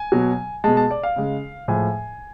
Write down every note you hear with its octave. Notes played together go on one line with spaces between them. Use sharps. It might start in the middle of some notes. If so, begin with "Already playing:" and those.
Already playing: G#5
B2 F#3
B2 G#3 A5
A5
D5
F5
C#3 G#3
A2 F3 G#3 G#5